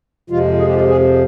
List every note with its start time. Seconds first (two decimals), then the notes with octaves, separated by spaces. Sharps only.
0.30 F2 C3 F3 G#3 F4
0.59 G#4
0.67 G4
0.73 F4
0.81 G3 G4
0.88 G#3 G#4